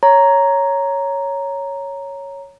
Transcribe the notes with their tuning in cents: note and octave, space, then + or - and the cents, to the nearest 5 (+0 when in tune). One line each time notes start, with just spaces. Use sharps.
C#5 +0 A#5 +0